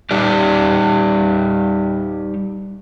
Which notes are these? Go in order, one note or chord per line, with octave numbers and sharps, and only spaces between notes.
G3 D#4 G4 D5